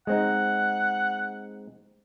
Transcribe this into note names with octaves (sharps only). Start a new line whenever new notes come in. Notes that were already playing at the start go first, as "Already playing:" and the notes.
G#3 C4 D#4 F#5